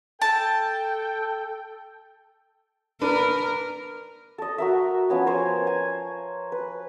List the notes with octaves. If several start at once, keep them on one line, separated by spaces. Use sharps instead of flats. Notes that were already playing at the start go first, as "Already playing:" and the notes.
A4 G5 A5
D4 A#4 B4
A4 D#5
F#4 A#4 E5
F3 B3 C#4
A#4 C5 C#5 G#5
G#5
B4